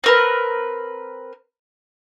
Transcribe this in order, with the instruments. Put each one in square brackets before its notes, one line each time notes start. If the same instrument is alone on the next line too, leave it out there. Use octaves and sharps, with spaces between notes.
[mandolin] C4 A#4 B4